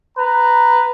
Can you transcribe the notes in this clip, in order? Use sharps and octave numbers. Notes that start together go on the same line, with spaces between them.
B4 A#5